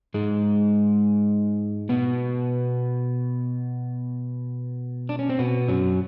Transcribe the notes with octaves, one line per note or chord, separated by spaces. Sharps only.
G#2 G#3
B2 B3
D4
C#4
C4
B2 B3
F#2 F#3